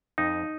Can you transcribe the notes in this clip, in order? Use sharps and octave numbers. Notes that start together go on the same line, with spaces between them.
F2 D#4